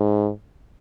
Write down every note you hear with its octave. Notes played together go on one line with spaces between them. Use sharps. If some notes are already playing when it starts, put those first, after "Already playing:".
Already playing: G#2